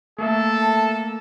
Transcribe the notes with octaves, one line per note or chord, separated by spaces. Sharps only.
A3 A#3 A4 E5
A5